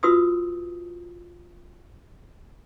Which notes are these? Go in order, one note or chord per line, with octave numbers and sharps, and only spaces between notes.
F4 F#4 B4 C6 D#6 E6